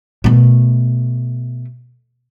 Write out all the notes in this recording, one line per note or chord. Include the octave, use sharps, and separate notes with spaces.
B2 A3